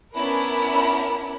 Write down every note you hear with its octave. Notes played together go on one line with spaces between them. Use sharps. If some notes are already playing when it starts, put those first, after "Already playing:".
B3 C#4 D4 E4 A#4